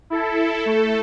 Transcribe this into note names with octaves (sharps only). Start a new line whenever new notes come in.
E4 A4
A3 A4